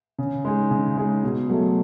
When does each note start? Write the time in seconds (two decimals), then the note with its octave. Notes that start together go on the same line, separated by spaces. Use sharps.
0.18 C#3
0.45 G#3 D#4 G#4
0.71 C#3
0.97 G#3 D#4 G#4
1.24 B2
1.50 F#3 A3